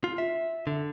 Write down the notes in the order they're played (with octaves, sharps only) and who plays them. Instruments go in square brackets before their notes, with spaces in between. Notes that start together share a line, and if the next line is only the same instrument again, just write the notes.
[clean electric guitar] F4
E5
D3